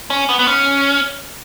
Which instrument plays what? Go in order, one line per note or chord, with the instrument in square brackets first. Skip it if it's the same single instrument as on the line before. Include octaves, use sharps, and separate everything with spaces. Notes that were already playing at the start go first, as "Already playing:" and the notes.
[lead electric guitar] C#4
B3
B3
C#4